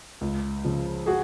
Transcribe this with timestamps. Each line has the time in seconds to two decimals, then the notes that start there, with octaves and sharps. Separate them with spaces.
0.21 C#2
0.64 C#3 F3
1.06 F#4 G#4